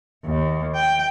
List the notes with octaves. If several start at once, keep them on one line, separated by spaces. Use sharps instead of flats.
D#2
G5